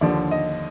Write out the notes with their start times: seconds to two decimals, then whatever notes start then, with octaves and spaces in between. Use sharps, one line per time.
0.01 D#2 D3 F3 D5
0.31 D#5